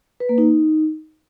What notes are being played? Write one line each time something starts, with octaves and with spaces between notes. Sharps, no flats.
B4
A#3
D#4